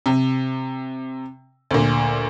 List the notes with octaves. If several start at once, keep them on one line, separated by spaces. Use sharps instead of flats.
C3
D2 A#2